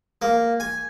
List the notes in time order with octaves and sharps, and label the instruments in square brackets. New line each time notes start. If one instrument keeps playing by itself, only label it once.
[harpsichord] A#3
G#5